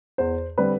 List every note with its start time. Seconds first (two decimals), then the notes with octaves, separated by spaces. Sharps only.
0.18 E2 C5
0.58 D3 G3 C4 B4